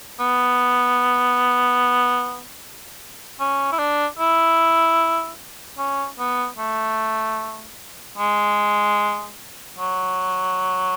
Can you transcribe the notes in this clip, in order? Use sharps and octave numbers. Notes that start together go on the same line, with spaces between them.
B3
C#4
E4
D4
E4
C#4
B3
A3
G#3
F#3